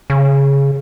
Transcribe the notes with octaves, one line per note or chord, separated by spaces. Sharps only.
C#3